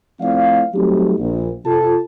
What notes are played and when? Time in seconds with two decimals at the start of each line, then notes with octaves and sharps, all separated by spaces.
0.21 F3 A3 C4 E4 D5 F5
0.74 F#3 G3 A3 C4 D#4 G4
1.19 A#1
1.65 C3 F4 A4 A5